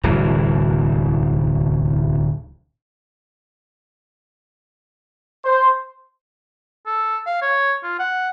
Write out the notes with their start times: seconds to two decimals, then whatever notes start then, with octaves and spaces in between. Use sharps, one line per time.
0.03 D1 C2 E3
5.43 C5
6.86 A4
7.26 F5
7.42 C#5
7.83 F4
7.99 F#5